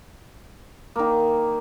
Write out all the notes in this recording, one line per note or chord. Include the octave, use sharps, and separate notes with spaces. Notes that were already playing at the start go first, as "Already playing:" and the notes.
D#3 A#3